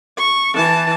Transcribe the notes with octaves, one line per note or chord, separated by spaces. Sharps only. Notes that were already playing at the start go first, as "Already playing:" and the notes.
C#6
E3 A5